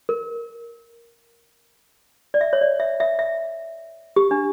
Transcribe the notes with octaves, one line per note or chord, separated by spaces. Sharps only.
A#4
D5
E5
C#5
D5
E5
E5
E5
G4
D4